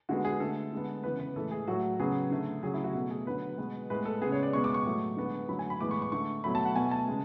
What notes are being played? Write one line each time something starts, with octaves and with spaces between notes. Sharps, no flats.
D3 G#3 B3 F#4
G#4
D3 A3 A4
D3 G#3 B3
C#3 E3 B3 B4
B4
A2 E3 G#3 A4
G#4
A2 F#3 A3 F#4
C#3 F#3 B3 G#4
D3 A3
C#3 F#3 A3 G#4
E4
F#4
B2 A3
G#4
D3 F#3 B3 B4
B2 G#3 B3
A2 G#3 B3 B4
A4
C#3 G#3 B3 G#4
C#5
D5
B2 G#3 B3 C#6
D6
C#6
A2 F#3 A3
D3 G#3 B3
D3 F#3 A3 B5
G#5
B5
A2 E3 G#3 B3 D6
C#6
C#6
D3 A3 C#6
B2 F#3 A3 B5
A5
F#5
B2 A3 G#5
A5
C#3 G#3 B3